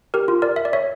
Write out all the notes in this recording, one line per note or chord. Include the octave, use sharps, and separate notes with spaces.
G4 A#4
F4
A#4 D5
E5
D5
C#5 E5